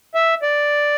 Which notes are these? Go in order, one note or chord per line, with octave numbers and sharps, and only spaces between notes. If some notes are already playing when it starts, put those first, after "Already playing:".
E5
D5